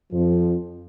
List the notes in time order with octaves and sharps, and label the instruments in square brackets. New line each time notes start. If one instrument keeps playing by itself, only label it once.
[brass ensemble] F2 F3